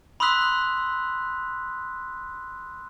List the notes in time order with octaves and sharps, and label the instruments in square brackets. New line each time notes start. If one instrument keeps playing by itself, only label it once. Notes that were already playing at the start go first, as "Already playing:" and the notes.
[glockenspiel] B5 C6 D#6 E6 F#6 B6